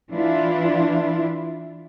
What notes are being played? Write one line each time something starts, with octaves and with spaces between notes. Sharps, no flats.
E3 D4 E4 F4